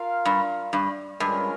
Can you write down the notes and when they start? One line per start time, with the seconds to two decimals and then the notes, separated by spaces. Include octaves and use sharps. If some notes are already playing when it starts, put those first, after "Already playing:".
Already playing: F4 A#4 F5
0.25 G2
0.73 G2
1.20 G2 G#3 C#4 F4 A#4